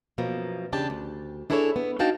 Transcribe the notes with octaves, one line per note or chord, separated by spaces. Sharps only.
F#2 B2 F3 A#3
E2 C#3 D4 G4 A5
D2
D4 E4 G#4 A4 C5 C#5
B3
D4 D#4 F#4 F5 G5 A5